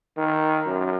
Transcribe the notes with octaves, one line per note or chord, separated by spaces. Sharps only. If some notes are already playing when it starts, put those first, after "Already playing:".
D#3
F#2